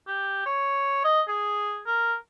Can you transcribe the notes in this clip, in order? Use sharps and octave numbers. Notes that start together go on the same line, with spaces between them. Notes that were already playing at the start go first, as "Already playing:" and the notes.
G4
C#5
D#5
G#4
A#4